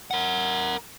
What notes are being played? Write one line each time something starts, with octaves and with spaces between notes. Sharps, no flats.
A#4 F#5